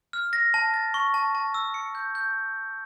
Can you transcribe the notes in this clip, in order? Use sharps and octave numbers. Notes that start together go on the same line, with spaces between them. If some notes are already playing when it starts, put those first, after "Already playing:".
F6
A#6
A5
A6
C#6
A5
A5
E6
C#7
G6
G6